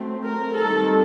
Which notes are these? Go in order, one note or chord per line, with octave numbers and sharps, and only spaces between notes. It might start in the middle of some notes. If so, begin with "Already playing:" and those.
Already playing: F#3 A3 C4
A#4
D#3 G3 C4 A4